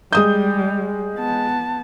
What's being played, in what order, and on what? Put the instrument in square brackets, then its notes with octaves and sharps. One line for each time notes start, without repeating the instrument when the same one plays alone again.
[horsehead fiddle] G3 [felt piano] G#3 D#6 G6
[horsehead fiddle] B3 A5